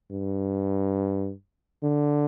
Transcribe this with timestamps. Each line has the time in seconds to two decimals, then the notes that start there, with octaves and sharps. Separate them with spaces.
0.11 G2
1.83 D3